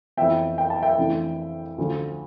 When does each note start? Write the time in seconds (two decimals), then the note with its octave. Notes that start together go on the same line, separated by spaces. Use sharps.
0.17 F2 E3 B3 E5 G5
0.58 G5
0.70 A5
0.82 E5 G5
0.98 F2 C3 E3 A3 D4
1.78 D2 D3 F3